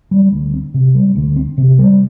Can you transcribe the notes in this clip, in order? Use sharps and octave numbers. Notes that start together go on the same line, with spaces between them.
G3
D2
C4
C3
G3
D2
C4
C3
G3